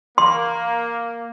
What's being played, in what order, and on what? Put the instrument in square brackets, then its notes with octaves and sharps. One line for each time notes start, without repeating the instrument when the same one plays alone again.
[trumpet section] A#3 [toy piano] C6